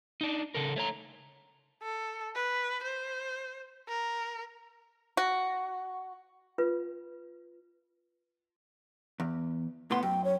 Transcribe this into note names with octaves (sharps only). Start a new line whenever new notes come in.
D4 D#4
C#3 A4 A#4
A3 C#5 A#5
A4
B4
C5
A#4
F#4
F4 B4
E2
A2 B3 F#5 C6
F#2 G5
C#5